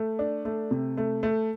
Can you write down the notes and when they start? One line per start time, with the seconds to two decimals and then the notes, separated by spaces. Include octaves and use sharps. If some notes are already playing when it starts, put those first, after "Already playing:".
Already playing: A3
0.19 D4
0.45 A3
0.71 C3
0.97 A3
1.23 A3